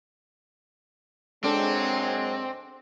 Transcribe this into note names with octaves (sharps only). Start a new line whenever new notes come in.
A#2 F#3 G#3 C4 D4 A4